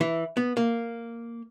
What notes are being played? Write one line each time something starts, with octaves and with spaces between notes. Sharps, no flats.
E3
B3
A#3